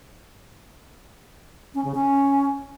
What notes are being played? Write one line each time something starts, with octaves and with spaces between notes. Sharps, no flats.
C#4
C#3
C#4